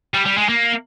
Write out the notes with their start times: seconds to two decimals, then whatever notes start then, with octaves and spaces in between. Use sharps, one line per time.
0.14 G3
0.26 G3
0.37 G#3
0.49 A#3